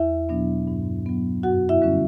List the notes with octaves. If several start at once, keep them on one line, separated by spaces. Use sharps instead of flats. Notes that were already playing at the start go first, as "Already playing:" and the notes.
Already playing: E2 E4 E5
B2 F#3 B3 D4
G2
F#3 B3
F#2 F#4 F#5
E4 E5
D3 G3 C#4